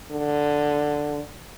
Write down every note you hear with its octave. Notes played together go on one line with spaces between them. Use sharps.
D3